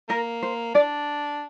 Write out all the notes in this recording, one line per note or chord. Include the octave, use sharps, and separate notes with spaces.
A#3 A#4
C5
D4 D5